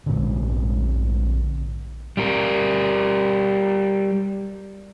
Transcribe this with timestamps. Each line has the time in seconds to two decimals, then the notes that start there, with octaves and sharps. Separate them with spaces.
0.06 A#1 G#2 D3
2.17 G3 A#4